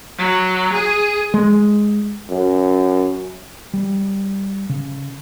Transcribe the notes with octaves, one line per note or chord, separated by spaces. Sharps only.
F#3
G#4
G#3
F#2
G3
C#3